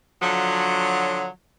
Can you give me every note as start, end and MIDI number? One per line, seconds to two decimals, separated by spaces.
0.21 1.26 50
0.21 1.26 53
0.21 1.26 54